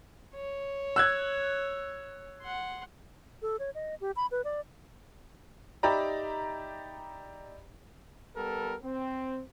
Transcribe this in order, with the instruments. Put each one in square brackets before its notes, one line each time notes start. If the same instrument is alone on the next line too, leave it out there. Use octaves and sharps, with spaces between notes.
[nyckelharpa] C#5
[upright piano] E6 F#6 G#6
[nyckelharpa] F#5 C6
[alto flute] A4
C#5
D#5
G4
B5
B4
D5
[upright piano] D#4 G4 D5 E5 A#5 B5
[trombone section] G3 B3 A4 A#4
C4